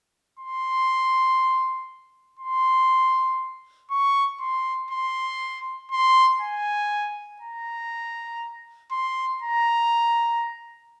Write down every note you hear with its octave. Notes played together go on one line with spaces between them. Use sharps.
C6
C6
C#6
C6
C6
C6
G#5
A#5
C6
A#5